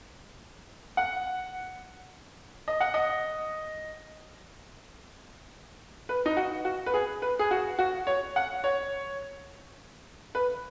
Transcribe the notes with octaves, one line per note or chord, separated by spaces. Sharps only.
F#5
D#5
F#5
D#5
B4
D#4
F#4
F#4
B4
G#4
B4
G#4
F#4
F#4
C#5
F#5
C#5
B4